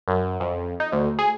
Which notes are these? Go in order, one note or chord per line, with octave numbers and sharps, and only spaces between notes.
F#2
F2
D#4
D2
G#4